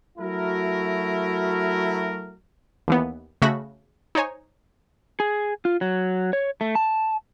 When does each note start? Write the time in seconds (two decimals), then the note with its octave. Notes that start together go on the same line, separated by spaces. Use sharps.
0.18 F#3 A3 E4 F#4 A#4
2.88 D#2 E3 B3
3.42 C#3 A3 F#4 E5 B5 A#6
4.15 D#4 C5 C#5 G#5
5.20 G#4
5.65 F4
5.81 F#3
6.33 C#5
6.61 A3
6.75 A5